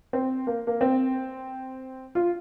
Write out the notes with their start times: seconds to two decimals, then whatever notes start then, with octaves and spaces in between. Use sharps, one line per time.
0.13 C4
0.47 A#3
0.67 A#3
0.81 C4
2.15 F4